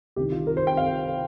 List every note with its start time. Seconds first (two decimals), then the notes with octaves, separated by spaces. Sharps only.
0.16 C2 C3 D#3 G4
0.32 F4
0.47 A#4
0.57 C5
0.67 G5
0.77 F5